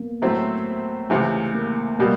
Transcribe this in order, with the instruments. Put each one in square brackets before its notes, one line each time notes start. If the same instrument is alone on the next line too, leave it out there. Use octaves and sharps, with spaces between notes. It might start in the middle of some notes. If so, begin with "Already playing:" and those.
Already playing: [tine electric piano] A#3 B3
[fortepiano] A2 F#3 A3 C4
[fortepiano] C#2 C3 E3 [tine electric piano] A3
[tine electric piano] A#3
[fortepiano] B2 G3 [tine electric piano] A#3